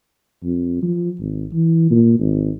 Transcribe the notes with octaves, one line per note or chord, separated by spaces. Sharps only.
F2
F3
G#1
E3
A#2
G#1